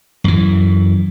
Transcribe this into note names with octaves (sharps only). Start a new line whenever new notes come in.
F#2 E3